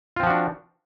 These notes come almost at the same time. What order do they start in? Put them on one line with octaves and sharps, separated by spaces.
F4 C4 F3 F#4 D4